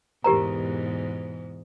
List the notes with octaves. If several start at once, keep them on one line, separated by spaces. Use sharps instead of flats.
E2 G#2 B2 G4 A#4 A#5